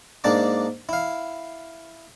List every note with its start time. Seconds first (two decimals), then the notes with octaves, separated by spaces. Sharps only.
0.24 G#2 A#3 D4 A5 D6
0.89 E4 F5